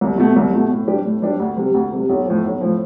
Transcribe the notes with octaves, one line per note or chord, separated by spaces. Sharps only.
C2
B2 A3
C2
B2 A3
A2
G3 D4 G4
A2
G3 D4 G4
D2
C3 G3
D2
C3 G3
B1
A2 F3
B1
A2 F3